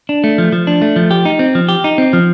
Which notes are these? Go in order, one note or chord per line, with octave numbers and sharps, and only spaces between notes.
D4
A3
F3
F3
D4
A3
F3
G4
D#4
C4
F3
G4
D#4
C4
F3